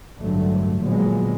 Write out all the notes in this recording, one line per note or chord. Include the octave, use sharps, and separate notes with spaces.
A1 G2 D3 F#3 A3
A#2 D3 F3 F#3 G#3 B3